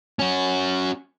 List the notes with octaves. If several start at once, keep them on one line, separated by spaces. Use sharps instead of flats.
C#4 F#4